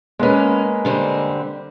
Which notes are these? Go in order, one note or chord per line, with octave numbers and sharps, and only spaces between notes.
G#3 A#3 B3 C#4 B4
D3 G3 C4